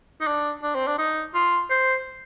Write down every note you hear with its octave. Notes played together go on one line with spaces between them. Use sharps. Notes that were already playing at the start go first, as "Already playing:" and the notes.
D#4
D4
D4
C4
D4
D#4
F4
C5